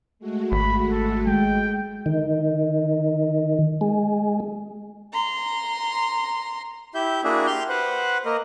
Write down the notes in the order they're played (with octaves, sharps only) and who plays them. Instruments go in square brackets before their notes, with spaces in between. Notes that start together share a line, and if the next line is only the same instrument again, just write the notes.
[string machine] G#3 A3 F#4
[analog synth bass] G#1 [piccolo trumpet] B5
[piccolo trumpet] A4
[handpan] G#3 [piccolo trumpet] G5
[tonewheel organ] D#3
G#3
[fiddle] A#5 C6
[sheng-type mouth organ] E4 G4 E5 G6
A#3 D4 E4 F#4 G#4 E5
G4 C6 F6 G6
B4 C5 F#5
A#3 A#4 D#5